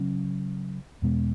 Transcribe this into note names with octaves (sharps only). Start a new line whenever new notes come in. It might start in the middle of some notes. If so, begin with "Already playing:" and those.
Already playing: C#3 F#3 C#4
E2 B2 G#3 B3